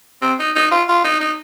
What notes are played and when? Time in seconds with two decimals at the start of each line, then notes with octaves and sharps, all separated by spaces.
0.22 C4
0.39 D#4
0.56 D#4
0.71 F4
0.88 F4
1.04 D#4
1.20 D#4